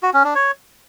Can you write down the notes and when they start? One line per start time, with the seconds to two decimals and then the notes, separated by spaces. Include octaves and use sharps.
0.03 F#4
0.14 C#4
0.24 D4
0.35 C#5